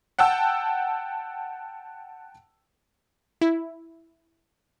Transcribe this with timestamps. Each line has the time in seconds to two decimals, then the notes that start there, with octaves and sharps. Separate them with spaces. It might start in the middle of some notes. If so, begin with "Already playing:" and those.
0.19 F#5 G5 A5 E6
3.41 E4